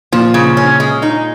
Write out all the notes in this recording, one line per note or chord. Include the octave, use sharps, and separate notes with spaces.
A#2 F3
C#3
C#4
G#3
D#4